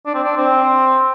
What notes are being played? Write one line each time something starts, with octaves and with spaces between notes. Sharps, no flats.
D4
C4
D4
C4